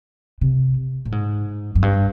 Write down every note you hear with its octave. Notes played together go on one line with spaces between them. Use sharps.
C3
A2
G#2
F#2
G2